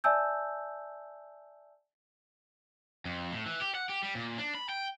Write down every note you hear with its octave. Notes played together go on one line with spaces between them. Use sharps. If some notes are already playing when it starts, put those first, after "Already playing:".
D5 E5 G#5 A5 E6 G6
F2
A2
E3
G4
F#5
G4
G3
A#2
D4
B5
G5